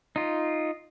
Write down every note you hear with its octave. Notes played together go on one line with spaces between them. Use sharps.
D#4 F4